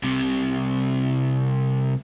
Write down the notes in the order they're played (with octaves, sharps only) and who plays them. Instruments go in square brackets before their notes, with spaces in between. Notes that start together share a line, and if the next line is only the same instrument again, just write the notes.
[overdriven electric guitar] C2 C3